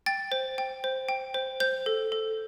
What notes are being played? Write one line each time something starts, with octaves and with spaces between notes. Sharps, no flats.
G5 A6
C5
G5
C5
G5
C5
C5 G6
A4
A4